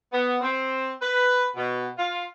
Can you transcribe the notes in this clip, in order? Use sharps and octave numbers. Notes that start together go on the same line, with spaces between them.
B3
C4
B4
B2
F4